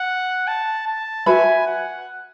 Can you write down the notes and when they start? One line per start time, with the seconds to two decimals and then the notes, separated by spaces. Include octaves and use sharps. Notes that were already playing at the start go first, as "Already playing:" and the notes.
Already playing: F#5
0.48 A5
0.87 A5
1.26 F#4 B4 E5 G#5 B5
1.67 F#5